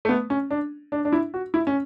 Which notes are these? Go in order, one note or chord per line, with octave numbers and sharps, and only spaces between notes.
A3
B3
C#4
D4
D4
D4
E4
F#4
E4
C#4